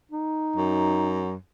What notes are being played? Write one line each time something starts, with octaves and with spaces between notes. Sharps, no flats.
D#4
F#2